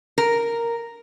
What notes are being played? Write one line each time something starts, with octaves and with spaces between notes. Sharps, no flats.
A#4